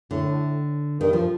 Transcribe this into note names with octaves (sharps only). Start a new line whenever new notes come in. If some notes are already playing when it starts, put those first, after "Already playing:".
A2 D3
G2 D#3
F3